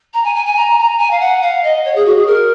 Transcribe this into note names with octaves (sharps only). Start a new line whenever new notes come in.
A#5
G#5
G#5
G#5
A#5
A#5
G#5
F5
F#5
F5
D#5
C#5
G#4
F#4
G#4
A#4